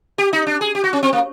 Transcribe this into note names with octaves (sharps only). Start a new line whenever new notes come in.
G4
D#4
D4
G#4
G4
F#4
C#4
C4
A#3